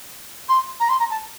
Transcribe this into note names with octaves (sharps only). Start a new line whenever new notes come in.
C6
A#5
C6
A#5
A5